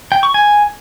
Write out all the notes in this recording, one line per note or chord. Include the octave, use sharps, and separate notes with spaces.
G5
C#6
G#5